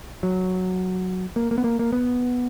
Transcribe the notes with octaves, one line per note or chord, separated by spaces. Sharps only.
F#3
A#3
A#3
B3
A#3
A#3
B3